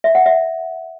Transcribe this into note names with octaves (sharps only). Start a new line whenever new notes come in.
E5
F#5
E5